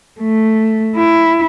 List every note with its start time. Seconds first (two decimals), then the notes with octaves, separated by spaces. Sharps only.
0.21 A3
0.96 E4